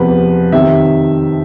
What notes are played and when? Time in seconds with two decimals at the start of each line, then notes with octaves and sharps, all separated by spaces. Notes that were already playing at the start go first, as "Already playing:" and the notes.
Already playing: E2 C3 F3 B4
0.52 F2 C3 D#3 E5